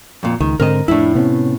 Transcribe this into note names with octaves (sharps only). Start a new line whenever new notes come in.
F2 A#2
C#2 D#3
G#2 D3 C4 A#4 D#5
F2 A2 B3 D4 E4
C3 B3 C#4